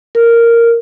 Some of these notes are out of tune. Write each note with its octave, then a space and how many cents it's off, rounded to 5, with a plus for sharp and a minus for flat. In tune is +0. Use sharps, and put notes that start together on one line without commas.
A#4 -5